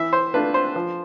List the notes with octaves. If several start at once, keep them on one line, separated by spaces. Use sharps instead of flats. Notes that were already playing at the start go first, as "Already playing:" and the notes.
Already playing: E3 E5
C5
A3 D4 F4 B4
C5
F3